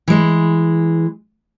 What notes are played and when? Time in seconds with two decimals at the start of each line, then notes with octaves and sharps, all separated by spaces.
0.08 E3 G#3